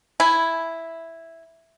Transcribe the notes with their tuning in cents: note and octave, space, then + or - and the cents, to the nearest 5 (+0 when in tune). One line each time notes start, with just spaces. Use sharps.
E4 +0 G#5 +0